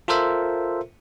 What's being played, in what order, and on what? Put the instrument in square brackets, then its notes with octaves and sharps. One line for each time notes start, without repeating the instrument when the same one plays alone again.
[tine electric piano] F4 A4 A#4 C5 E5